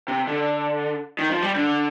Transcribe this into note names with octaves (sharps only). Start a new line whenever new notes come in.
C3
D3
D#3
F3
G3
D3